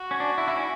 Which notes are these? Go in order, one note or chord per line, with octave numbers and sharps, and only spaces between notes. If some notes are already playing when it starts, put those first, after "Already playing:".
Already playing: F#4
C#4
D4
E4
E4
C#4